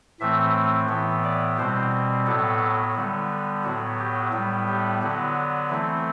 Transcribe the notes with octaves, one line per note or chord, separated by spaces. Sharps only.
A2 E3 A3 C4 E5
A2 E3 B3
D5
B2 G3 C4 C5
A2 F#3 B3 A4
D3 G3 B3
A2 F#3 B3 F#4
G4
A2 G3 B3
G4
D3 F#3 B3
E3 A3 C4 E4